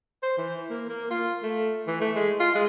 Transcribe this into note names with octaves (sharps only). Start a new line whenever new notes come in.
C5
E3
A#3
A#3
F4
A3
E3
A3
G#3
F4
G#3